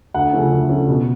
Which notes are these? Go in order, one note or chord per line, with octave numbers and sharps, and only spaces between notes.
D2 F#5
C#3 F3 A3 C#4
D2
C#3 F3 A3 C#4
B2